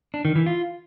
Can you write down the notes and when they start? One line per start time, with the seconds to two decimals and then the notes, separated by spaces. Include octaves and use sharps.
0.14 D4
0.25 D#3
0.36 E3
0.46 F4